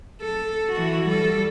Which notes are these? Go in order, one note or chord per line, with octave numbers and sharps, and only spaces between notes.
A4
E3 F#4
G3 A4